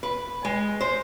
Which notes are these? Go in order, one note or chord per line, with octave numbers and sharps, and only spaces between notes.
B4
G#3
C5